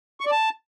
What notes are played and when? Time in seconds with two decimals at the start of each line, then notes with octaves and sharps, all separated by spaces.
0.20 C#6
0.26 D5
0.31 A5